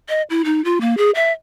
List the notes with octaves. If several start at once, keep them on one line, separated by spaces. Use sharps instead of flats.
D#5
E4
D#4
F4
A#3
G#4
E5